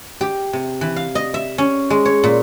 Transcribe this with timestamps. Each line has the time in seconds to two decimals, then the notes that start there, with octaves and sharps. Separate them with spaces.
0.21 G4
0.53 C3
0.81 E3
0.96 F5
1.15 D#5
1.34 E5
1.58 C#4
1.90 G#3
2.05 C#5
2.24 A#2